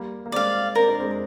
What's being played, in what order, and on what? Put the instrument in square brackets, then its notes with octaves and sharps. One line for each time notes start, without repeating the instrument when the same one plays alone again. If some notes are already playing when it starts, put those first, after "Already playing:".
Already playing: [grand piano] G3 A#3
A#3
[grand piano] G#3 C4 [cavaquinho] D5 F5
[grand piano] C4 [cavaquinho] A#4
[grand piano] D4
G#3 C4